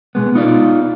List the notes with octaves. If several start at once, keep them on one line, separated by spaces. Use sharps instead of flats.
B2 G#3 B3
B3 D#4 F4 D5